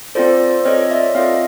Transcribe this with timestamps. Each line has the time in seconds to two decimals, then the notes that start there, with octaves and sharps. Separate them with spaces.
0.15 C4 F4 A4 C5 D5
0.65 C4 F4 A4 C#5 D#5
0.90 D5 E5
1.15 C4 F4 A4 D#5 F5